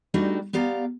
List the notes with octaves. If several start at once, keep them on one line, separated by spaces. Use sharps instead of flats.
G3 A3 D4 D#4 F#4 G4
B3 G4 D5 F5 A#5